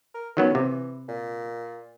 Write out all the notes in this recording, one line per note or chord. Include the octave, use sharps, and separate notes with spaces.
A#4
D#3 F#3 B3 C#4
C3 E3
A#2